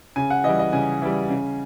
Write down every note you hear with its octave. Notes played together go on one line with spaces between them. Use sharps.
C#3 G#5
F#5
E3 G3 D#5
D#5
C#3 G#5
E3 G3
C#3